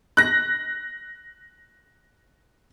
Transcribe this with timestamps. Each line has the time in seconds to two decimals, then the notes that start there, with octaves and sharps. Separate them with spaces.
0.17 F#6 A#6